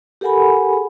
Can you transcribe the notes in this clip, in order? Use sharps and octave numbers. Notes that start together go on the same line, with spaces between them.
G4 A4 A#4 F#5 G#5 B5
G#4